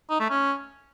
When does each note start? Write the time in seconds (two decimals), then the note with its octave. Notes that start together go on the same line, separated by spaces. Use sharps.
0.10 D#4
0.20 A3
0.30 C#4